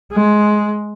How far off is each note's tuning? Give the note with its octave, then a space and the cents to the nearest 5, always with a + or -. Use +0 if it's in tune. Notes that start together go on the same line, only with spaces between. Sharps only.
G#3 +15